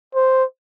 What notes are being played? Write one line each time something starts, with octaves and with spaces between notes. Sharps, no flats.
C5